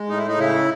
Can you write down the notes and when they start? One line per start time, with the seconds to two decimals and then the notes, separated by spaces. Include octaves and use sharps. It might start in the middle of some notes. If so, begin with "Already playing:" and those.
Already playing: G#3
0.09 A2 D#4
0.18 E4
0.28 D#4
0.38 C#3 E4